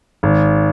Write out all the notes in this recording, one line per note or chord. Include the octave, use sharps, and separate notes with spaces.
G#1